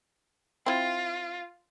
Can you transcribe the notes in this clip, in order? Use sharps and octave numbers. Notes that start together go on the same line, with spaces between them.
C4 E4 F4